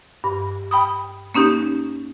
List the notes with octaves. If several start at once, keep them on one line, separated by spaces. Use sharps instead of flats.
G2
G5 B5 D#6
A#3 C#4 D#4 G4